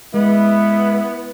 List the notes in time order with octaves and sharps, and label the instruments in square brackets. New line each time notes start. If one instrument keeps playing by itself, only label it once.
[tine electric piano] G#3 [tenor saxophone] B3 [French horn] E4